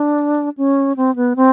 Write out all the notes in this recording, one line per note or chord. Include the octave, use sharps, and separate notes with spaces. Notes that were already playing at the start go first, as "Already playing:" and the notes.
Already playing: D4
C#4
C4
B3
C4